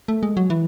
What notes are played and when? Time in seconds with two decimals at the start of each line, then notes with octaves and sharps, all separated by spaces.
0.08 A3
0.23 G#3
0.37 F#3
0.50 E3